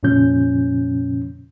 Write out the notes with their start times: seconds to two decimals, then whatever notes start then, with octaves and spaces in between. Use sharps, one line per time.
0.03 F2 A#2 C#3 F3 C#4 G6